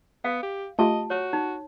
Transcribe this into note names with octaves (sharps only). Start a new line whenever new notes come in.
B3 F5
G4
A3 F4 G4 D#5 A5
F#4 C#5
D#4